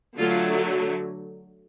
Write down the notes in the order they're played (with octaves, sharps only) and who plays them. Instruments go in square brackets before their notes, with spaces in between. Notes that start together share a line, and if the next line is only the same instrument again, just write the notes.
[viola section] D3 F#3 A3 F4